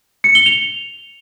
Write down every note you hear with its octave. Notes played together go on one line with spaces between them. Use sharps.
C#7
G7
F7